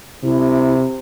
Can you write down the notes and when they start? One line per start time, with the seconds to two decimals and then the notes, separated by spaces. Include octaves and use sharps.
0.24 C3 E4